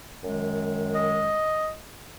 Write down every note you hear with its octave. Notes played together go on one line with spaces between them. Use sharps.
F#2 D#3 G#3
D#5